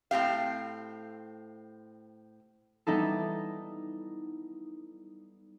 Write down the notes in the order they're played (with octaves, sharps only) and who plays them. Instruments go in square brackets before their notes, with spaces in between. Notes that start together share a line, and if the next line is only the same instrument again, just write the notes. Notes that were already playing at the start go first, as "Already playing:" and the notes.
[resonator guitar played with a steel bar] A2 C4 G4 F5
[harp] G3 B3 D#4 E4 A4